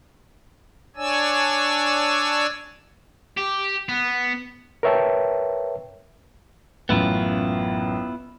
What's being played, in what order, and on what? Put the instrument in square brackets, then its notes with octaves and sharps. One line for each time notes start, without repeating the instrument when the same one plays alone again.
[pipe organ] D4 C#5 D5 G#5 E6
[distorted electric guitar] G4
B3
[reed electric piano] A#4 B4 C#5 E5 G5 A5
[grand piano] A1 F#2 [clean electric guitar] B3 E4 F4